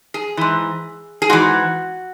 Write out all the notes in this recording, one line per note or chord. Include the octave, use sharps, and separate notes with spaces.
G#4
G#2 E3
G#4
G#2 E3 F#4